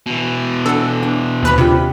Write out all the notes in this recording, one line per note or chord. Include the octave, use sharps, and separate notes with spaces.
B2 E3
D4 A4 F#5
D4
D#2 B4 B5
C3 D4 F4 G4